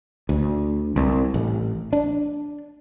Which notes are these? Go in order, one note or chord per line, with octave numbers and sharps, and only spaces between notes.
D2
C2
A1
D4